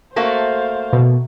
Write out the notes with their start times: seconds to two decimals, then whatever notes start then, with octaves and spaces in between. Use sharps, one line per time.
0.16 A3 A#3 F#4 C5 F5
0.93 B2